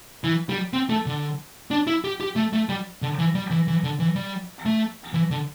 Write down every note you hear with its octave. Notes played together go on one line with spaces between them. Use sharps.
E3
G3
C4
A3
D3
D4
E4
G4
G4
A3
A3
G3
D3
E3
G3
E3
E3
D3
E3
G3
A3
E3
D3